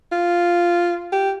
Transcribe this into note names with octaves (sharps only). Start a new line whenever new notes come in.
F4
G4